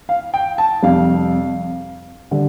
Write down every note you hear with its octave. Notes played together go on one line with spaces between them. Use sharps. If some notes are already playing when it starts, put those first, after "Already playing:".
F5
G5
A5
F2 C3 G3 F5
D3 G3